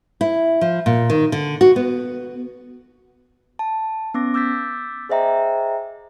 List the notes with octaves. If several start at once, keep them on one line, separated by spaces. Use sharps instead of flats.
E4
F3
A#2
D#3
D3
F#4
B3
A5
B3 C#4 D6 A#6
D6 E6 G6 A6 B6
G#4 C5 D#5 E5 G5 A#5